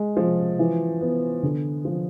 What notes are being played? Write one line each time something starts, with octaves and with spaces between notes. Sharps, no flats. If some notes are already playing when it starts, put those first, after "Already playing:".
Already playing: G#3
F3
E3
B3
D3
F3